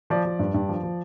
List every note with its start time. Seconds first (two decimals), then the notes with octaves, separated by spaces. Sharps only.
0.10 F3 D5
0.25 F3
0.39 G2
0.54 G2
0.69 F3
0.83 F3